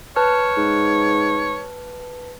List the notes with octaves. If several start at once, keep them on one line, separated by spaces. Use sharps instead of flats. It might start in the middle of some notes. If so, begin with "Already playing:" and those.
B4 C#5 A5 F6
G#2